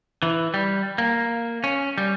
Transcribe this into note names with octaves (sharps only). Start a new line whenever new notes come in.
E3
G3
A#3
C#4
G3